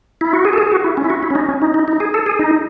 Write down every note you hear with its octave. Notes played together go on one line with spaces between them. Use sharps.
E4
F#4
G#4
A4
G#4
F#4
E4
C#4
E4
F#4
E4
C#4
D#4
C#4
D#4
D#4
D#4
G#4
A4
G#4
D#4